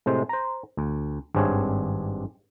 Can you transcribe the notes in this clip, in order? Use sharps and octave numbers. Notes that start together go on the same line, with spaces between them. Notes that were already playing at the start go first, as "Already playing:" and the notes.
A2 C3 G#3 C5
C5 A#5
D2
G#1 G2 C4 D4 G#4 C#5